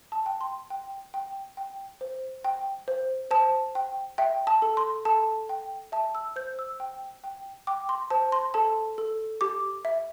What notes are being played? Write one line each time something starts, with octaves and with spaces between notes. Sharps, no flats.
A5
G5
C6
G5
G5
G5
C5
G5
C5
C5 A5
G5
E5 G5
A5
A4
C6
A4 A5
G5
E5 A5
E6
C5 G6
E6
G5
G5
G5 D6
C6
C5 A5
C6
A4 A5
A4
G4 D6
E5